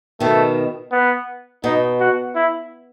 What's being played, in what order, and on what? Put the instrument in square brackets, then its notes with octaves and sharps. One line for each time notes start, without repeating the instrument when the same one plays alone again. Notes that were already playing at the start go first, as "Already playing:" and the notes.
[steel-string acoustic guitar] B2 D#3 [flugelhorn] A3
[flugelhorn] B3
[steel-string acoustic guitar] B2 [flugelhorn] D#4
[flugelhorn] F#4
E4